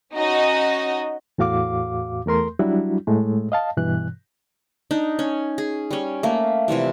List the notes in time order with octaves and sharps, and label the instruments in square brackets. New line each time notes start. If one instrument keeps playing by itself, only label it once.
[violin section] C#4 D#4 F#4 D#5
[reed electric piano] E2 A2 F#4 F5 D6
E2 A3 A#4 C6
F#3 G3 D4 E4 F#4
A2 G#3 A3
D#5 F5 A5
G2 B2 E3 F#6
[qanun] D4 D#4
C#4
G#4
G3 C#4
A3 A#3
C3 E3 F3 G3